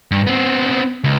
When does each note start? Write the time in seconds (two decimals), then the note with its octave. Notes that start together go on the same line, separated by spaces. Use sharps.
0.11 G2
0.27 B3 C4
1.04 C#2